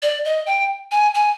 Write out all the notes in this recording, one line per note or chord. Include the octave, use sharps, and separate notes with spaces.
D5
D#5
G5
G#5
G#5